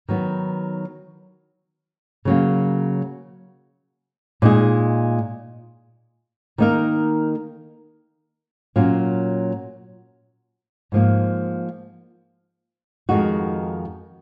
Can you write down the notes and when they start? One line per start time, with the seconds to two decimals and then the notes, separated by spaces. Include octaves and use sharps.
0.08 D#3 F#3 B3
2.25 C#3 F#3 A#3
4.42 A#2 G#3 D#4 G#4
6.58 D#3 A#3 D#4 A#4
8.76 A#2 F#3 C#4 F4
10.92 G#2 F3 A#3
13.09 F2 D#3 G#3 D#4 F#4